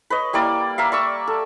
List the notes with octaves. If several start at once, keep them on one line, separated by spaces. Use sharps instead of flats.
B4 C#5 D#5
G3 A#3 E4 D5
A#4 E5 F5
D5 C#6 E6
A4